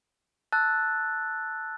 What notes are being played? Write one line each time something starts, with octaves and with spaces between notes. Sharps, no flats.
A5 E6 F#6 A6